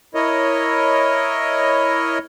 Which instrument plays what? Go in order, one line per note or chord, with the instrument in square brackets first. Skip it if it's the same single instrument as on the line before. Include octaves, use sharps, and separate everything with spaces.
[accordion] E4 A#4 C#5 D#5